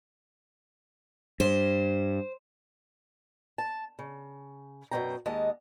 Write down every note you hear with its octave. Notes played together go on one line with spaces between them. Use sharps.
G2 C5
A5
C#3
F#2 B2 F3 D4 G5 A#5
D#2 G#3 D#5 F#5 A5